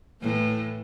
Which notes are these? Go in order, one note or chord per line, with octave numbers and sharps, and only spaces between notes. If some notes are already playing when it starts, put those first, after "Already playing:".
A2 E3